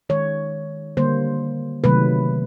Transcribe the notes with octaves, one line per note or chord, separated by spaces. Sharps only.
D#3 G#3 C#5
D3 G3 A#3 C5
C3 D#3 F#3 A3 B4